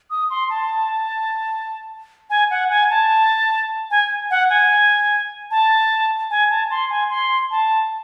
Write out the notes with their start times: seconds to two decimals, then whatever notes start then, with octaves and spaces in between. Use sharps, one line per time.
0.10 D#6
0.30 C6
0.50 A5
2.30 G#5
2.50 F#5
2.70 G#5
2.90 A5
3.91 G#5
4.31 F#5
4.50 G#5
5.51 A5
6.30 G#5
6.50 A5
6.71 C6
6.90 G#5
7.10 C6
7.51 A5